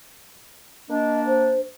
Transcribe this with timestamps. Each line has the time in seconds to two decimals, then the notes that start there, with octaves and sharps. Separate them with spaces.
0.90 A#3 D4 D#5
1.26 C5